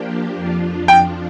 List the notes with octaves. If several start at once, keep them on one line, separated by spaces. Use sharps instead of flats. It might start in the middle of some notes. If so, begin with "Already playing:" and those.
Already playing: F3 A#3 D4 G4
F2 F3 D4 F4
G5